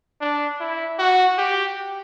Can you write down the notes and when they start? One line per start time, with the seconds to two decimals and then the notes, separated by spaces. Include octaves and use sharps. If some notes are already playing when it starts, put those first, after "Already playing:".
0.21 D4
0.60 E4
0.99 F#4
1.38 G4